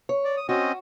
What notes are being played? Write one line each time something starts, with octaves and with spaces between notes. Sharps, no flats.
C#5
D5
D#6
C4 C#4 F#4 D#5